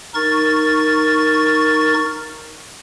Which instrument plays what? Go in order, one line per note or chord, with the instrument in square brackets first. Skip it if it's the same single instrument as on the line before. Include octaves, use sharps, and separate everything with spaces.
[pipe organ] D#4 A#4 C#6 A6